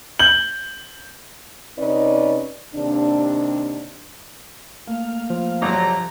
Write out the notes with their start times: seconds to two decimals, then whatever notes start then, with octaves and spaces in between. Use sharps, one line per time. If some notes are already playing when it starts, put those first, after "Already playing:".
0.19 G6 F#7
1.78 C3 C#4 D#4 B4 D5
2.74 D#2 C3 D4
4.87 A3 A#3 F5
5.30 F3
5.62 G1 C3 F#3 A4 A#5